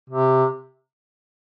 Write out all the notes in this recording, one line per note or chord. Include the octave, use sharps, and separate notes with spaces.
C3